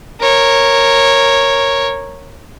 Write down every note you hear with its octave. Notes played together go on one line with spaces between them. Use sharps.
A#4 C#5